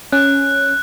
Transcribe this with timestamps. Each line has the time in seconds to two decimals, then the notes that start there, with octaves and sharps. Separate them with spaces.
0.12 C#4 F#6